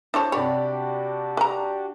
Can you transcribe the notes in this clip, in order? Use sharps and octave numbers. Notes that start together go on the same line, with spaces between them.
D4 E4 C5 C#5 A5
C3 D4 F#4 G4 C#5 D5 B5
B4 A#5